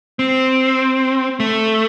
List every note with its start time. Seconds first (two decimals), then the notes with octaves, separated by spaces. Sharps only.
0.19 C4
1.40 A3